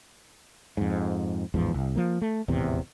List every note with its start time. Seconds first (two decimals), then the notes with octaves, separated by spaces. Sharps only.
0.77 F2 G#2
1.54 A1 E2 G#2 F3
1.74 C2
1.96 F3 A#3
2.21 A3
2.48 D#1 A1 E2 C3